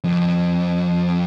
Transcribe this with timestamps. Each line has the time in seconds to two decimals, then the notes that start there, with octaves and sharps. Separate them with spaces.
0.04 F2